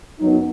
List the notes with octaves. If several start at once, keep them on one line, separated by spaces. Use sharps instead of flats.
F#2 F#3 B3 D#4